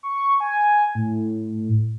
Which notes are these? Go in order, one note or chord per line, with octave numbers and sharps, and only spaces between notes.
C#6
G#5
A2